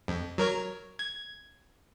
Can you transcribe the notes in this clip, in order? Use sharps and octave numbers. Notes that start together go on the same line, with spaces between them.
F2
F#3 A#4 C#5
G#6